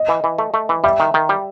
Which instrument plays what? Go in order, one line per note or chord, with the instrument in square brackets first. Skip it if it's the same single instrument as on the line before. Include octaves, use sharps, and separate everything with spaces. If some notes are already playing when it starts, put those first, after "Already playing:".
Already playing: [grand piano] D#5
[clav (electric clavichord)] E3
E3
A3
A3
E3
[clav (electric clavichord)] G3 [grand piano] E5
[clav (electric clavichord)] D#3
D#3
G3